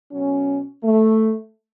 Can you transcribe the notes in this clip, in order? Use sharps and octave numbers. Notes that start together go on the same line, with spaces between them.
B2 F#3 C#4
A3